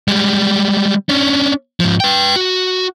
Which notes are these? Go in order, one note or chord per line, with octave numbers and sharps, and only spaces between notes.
G3 G#3
C#4 D4
G#2 F3
B4 G5
F#4